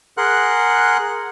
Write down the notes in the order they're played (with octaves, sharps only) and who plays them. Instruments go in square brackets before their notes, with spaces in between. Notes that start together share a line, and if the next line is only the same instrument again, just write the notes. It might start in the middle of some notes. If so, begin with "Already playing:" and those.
[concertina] G#4 A#4 F#5 C6 F#6